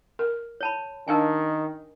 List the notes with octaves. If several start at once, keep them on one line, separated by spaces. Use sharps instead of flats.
A#4
C#5 A5 B5
D#3 D4 A#4 D#5 F5 G#5 A5